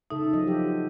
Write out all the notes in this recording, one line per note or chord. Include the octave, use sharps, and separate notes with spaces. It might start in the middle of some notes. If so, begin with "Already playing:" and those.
C#3 D#4 A4 E5
F3 F#3 D#5
G4